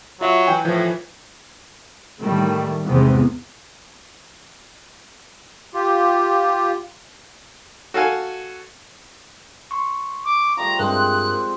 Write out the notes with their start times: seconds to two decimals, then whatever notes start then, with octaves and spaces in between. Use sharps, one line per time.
0.21 F#3 F4 E5
0.47 E3 G5 G#5
0.65 A2 E3 F3
2.21 A2 D#3 E3 G3 A3
2.83 E2 G#2 C3 E3 B3
5.74 F4 G4
7.94 F#4 A4 F5 G#5
9.71 C6 C#6
10.25 D6
10.57 F3 G3 A3 A#5
10.79 G2 G#3 C4 A#4 F#6